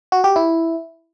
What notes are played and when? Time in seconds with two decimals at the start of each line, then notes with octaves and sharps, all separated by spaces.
0.12 F#4
0.24 G4
0.36 E4